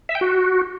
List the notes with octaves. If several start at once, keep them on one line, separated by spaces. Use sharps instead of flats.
E5
G5
F#4